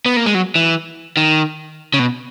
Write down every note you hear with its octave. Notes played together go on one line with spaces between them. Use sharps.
B3
A#3
G#3
F#3
E3
D#3
C#3
B2